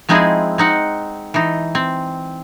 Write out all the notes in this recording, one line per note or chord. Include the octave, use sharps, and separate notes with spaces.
F3 G#3 C4 D#4 E4 G#4
C4 D#4 F#5
E3 D#4
C4